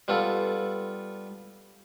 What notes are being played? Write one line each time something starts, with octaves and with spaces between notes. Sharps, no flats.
G3 B3 F4 A4